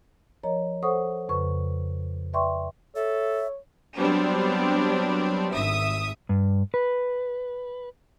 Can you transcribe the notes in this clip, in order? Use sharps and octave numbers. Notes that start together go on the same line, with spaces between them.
F3 A#4 C#5 D#5 A#5
A4 C5 C#5 F#5 C#6 D#6
F2 C#3 B4 C#6
B4 D5 E5 G5 C6 C#6
A4 C#5 E5
F#3 G3 B3 C4 D4
G#1 E5 D#6
G2
B4